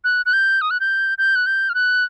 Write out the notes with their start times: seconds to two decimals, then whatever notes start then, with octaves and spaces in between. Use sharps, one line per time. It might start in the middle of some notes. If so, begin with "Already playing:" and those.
0.04 F#6
0.26 F#6
0.33 G6
0.61 D#6
0.71 F#6
0.80 G6
1.18 G6
1.35 F#6
1.46 G6
1.69 F6
1.74 F#6